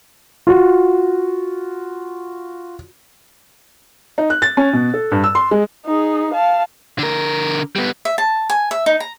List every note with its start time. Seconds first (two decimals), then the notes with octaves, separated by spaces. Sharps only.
0.47 F4 F#4
4.18 D#4
4.30 F#6
4.42 A6
4.57 C#4
4.73 B2
4.94 A4
5.12 G2
5.24 E6
5.35 C6
5.51 G#3
5.86 D#4 G#4
6.33 F5 A5
6.99 D3 A#4
7.76 G3 B3
8.05 E5
8.18 A5
8.50 G#5
8.71 E5
8.86 D#4
9.00 A#5